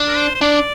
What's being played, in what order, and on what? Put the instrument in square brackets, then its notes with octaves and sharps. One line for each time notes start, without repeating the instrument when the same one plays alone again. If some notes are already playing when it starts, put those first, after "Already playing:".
Already playing: [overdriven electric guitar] D4
[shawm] A#4
C5
C5
[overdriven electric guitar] D4 [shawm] D5